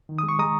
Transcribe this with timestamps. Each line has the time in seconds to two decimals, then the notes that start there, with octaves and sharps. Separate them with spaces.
0.09 D#3
0.19 G#3 D#6
0.29 C#6
0.39 G#3 A#5 D#6